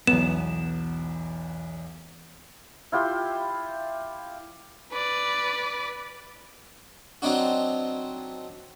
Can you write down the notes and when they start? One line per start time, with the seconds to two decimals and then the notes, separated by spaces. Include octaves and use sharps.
0.07 B1 E2 B3 E7
2.92 E4 F4 G4 G5
4.92 B4 D5
7.22 F#3 C4 D4 D#4 F#4